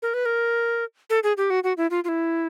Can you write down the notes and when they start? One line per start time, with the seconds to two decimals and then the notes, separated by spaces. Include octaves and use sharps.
0.02 A#4
0.14 B4
0.26 A#4
1.10 A4
1.23 G#4
1.37 G4
1.50 F#4
1.64 F#4
1.77 E4
1.91 F4
2.04 F4
2.09 E4